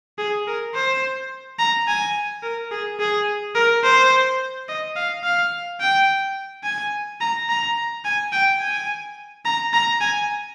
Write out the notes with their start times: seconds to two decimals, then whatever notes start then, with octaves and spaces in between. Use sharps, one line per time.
0.18 G#4
0.47 A#4
0.75 C5
1.59 A#5
1.88 G#5
2.43 A#4
2.72 G#4
3.00 G#4
3.55 A#4
3.84 C5
4.69 D#5
4.96 F5
5.24 F5
5.81 G5
6.64 G#5
7.21 A#5
7.49 A#5
8.05 G#5
8.33 G5
8.61 G#5
9.45 A#5
9.74 A#5
10.01 G#5